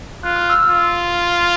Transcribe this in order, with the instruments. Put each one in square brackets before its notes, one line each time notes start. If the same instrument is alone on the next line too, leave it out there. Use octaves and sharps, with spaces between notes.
[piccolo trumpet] F4 [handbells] F#6
[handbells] F6
E6
[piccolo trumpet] F4 [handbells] F6